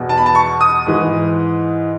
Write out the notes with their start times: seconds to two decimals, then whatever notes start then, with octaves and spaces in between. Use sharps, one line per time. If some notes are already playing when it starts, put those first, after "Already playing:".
Already playing: E2 B2
0.09 A5
0.17 B5
0.26 A5
0.35 C#6
0.61 D#6
0.86 G#2 E3